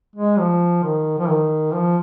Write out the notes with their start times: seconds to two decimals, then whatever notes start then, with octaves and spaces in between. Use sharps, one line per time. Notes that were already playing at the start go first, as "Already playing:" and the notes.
0.16 G#3
0.39 F3
0.84 D#3
1.19 F3
1.29 D#3
1.73 F3